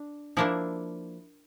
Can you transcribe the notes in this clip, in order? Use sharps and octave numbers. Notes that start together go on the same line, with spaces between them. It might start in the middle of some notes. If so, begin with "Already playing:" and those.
Already playing: D4
F3 A#3 D4 E4